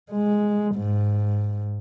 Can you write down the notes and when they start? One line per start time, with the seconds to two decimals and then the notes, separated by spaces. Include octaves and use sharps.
0.11 G#3
0.75 G#2